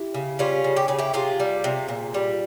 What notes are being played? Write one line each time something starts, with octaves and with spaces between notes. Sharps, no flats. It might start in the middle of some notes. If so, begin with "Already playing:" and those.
Already playing: E4 G4
C#3
G3 C#4 F4
C#3
G4
C#3 G#4
E4 G4
C3 F4 G#4
G3
C3
A#2
G3